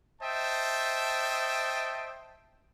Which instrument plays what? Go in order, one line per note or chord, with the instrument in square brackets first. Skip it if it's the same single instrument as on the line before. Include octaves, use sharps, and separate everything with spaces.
[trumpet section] C5 D#5 E5 G5 A5